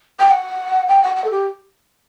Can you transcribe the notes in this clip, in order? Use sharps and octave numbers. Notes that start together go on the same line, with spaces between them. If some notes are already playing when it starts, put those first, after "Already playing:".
G5
F#5
G5
F#5
F#5
A4
G4